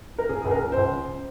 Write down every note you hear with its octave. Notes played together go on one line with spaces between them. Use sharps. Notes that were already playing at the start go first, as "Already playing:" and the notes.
A#4
C#3 G#4
C#2 G#4
A#4
C#3
C#2 C5
C#3